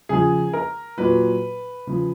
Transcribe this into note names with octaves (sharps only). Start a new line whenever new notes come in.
C#3 F3 G#4
A#4
A#2 F#3 B4
C#3 F3